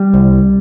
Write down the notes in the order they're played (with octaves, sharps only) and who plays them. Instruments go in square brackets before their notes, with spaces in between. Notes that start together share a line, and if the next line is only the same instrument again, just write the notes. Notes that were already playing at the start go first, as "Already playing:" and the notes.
Already playing: [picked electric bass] G3
C2